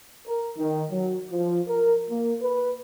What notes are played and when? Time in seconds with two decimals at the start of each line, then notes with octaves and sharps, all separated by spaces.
0.26 A#4
0.57 D#3
0.91 F#3
1.31 F3
1.68 A#4
2.10 A#3
2.42 B4